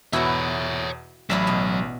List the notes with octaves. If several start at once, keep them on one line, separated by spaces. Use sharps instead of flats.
E2 B2 E4 F#4 C#5 E5
A1 F#3 E4 D5 E5
B2